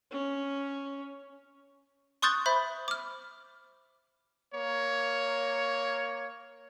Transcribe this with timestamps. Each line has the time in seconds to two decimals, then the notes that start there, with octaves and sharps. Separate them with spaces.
0.11 C#4
2.22 C6 C#6 D#6 F#6 G6 A6
2.46 C5 E5 B5 G6
2.88 D6 F6
4.55 A#3 C#5